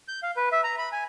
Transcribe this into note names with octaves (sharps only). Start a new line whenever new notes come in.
G6
F5
B4
E5
A#5
B5
G#5